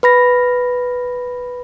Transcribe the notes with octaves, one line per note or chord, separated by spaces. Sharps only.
B4 B5 A#6